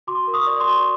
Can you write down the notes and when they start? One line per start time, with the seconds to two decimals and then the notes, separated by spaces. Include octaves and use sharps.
0.07 F#4 C6 D6
0.27 A#4
0.34 C#6 D#6
0.47 D5
0.60 C6 D6
0.67 F#4